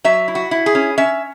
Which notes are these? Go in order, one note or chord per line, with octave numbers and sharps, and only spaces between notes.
F#3 E5
E4
F#4
E4
G#4
C#4
C#4 E5